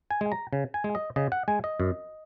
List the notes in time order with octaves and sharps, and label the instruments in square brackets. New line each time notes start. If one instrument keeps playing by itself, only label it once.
[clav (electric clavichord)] G#5
G#3
A#5
C#3
G#5
G#3
D#5
C#3 D#5
F#5
G#3 G#5
D#5
F#2